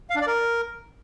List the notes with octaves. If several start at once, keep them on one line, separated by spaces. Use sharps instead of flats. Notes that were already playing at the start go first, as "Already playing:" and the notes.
F5
D4
D5
A#4